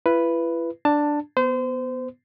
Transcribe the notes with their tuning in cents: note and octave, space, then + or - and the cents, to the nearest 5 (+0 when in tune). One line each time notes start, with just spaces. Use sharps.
E4 +40 B4 +0
D4 +0 A5 +15
B3 +0 C5 -30